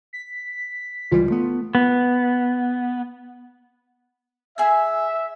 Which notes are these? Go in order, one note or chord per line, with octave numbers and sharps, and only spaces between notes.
B6
C#2 E3 G3 F4
A3 B3
B3
G#4 E5 G#5